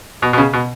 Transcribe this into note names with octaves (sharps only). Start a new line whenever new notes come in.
B2
B2
C#3
B2